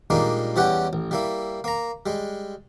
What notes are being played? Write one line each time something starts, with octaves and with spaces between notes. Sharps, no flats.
A#2 G3 G#3 A#3 D4 D#4
E2 E3 G3 C#4 G4 F#5
A1
G3 A#3 E4
A#3 A#5
G3 G#3